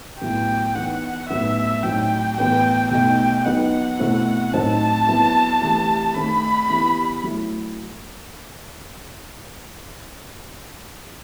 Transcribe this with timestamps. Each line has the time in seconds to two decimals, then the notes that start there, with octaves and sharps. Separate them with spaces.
0.20 A2 F#3 B3 E4 G5
0.75 E3 B3 D#4 F#5
1.29 A2 F#3 B3 D#4 E5
1.83 A2 F#3 C4 D#4 G5
2.37 A2 E3 B3 G5
2.91 B2 A3 D#4 G5
3.44 F#3 B3 D#4 F#5
3.99 B2 A3 C4 E4
4.53 A2 F#3 C4 D#4 A5
5.06 F#3 B3 E4
5.61 C3 E3 A3 E4
6.14 D#3 A3 C4 B5
6.69 E3 G3 B3 E4
7.23 F#3 A3 E4